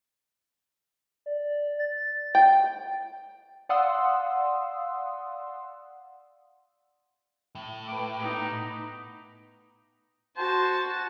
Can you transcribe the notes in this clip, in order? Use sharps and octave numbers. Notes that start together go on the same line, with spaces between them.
D5
A6
A6
G5
D5 F5 F#5 C6 D#6 E6
A2
A3 B4 D6
B3 D#4
F#4 C5 A5